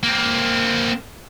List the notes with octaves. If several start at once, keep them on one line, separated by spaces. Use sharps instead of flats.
A#3 C4